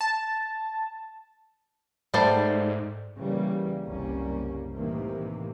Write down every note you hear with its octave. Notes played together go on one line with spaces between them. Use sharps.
A5
G#2 G3 A3 C5
C#3 E3 G3 A#3
F#1 C2 G3 A#3 C#4
A2 C3 D#3 E3 A#3